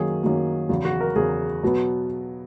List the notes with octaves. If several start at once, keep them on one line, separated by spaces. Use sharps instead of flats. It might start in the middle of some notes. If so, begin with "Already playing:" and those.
Already playing: F#2 D#3 F#3 A#3 G#4
F#2 D#3 F#3 A#3
E2 C#3 F#3
F#4
A#4
E2 C#3 F#3 G#4
B2 F#3 B3